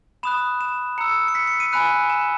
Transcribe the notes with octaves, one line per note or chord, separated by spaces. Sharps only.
B5 D#6 F#6 E7
E7
A#5 E6 C#7
C#7
B6
C#7
D#7
G#5 B5 F#6
E7